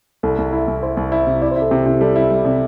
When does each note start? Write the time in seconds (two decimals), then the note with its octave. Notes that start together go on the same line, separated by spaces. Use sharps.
0.23 C2 A4
0.38 C2
0.52 E4
0.68 C2
0.83 E4 C5
0.97 C2
1.12 E4
1.27 C3
1.42 E4 D5
1.51 C5
1.56 E4
1.62 A4
1.71 C3 G4
1.86 C3 E4
2.01 G3 A4
2.16 E4
2.31 G3
2.45 C3